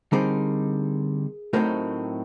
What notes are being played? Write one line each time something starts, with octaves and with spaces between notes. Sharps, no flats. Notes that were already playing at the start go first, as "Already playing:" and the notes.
D3 G3 C4 D#4 G#4 A#4
A2 F#3 A3 C4 D#4 A#4 C5